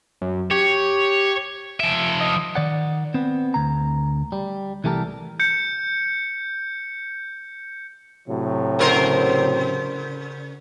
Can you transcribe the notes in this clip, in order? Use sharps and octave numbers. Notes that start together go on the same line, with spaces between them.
F#2
G4 C#5
F3 E5 D7
D#5
D#3 D5 F#5
B3 C4
D2 A#5
G3
C2 E3 A3 G4 A4 A#4
G6 C#7
A2 C3 F#3
C#3 A#4 C5